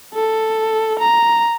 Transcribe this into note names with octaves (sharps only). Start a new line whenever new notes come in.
A4
A#5